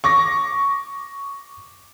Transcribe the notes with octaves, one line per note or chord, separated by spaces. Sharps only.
C#6 D6 A#6